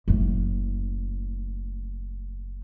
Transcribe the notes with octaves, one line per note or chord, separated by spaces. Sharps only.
F#1 A2